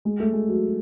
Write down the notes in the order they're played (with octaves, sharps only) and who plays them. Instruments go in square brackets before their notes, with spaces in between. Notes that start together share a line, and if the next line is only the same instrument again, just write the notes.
[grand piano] G#3
A3
G#3
F#3